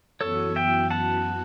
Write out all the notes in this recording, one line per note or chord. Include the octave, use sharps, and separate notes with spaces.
F#2 E3 B3 F#4 A4 C#5
E5 G5
F#5 A5